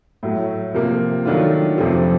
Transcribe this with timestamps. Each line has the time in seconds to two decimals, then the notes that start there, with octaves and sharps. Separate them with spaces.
0.23 A2 F#3 A3
0.74 C3 F3 A#3
1.25 D#3 F#3 A3 D4 F4
1.78 F2 C3 F3 A3